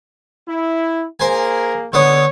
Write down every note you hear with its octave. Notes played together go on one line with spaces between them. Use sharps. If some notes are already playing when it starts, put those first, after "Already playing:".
E4
A#3 G#4 A#4 C5 G#5
D3 B3 C#5 D#6